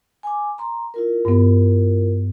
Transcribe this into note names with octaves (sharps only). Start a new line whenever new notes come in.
G#5 D6
A#5 C6
E4 F4 A#4
G2 B3